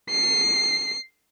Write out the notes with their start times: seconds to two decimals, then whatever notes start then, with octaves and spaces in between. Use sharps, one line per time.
0.10 C7